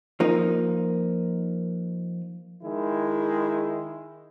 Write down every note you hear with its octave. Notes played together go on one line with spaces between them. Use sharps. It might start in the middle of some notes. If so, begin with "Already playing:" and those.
F3 A#3 D#4
D#3 G#3 E4